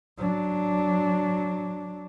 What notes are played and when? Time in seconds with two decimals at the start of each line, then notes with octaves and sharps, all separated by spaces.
0.18 F#3 D4